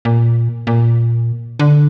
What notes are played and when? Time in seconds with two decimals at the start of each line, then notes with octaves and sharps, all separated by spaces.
0.05 A#2
0.67 A#2
1.59 D3